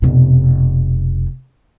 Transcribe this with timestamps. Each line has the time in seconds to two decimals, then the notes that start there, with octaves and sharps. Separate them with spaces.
0.02 F1 B2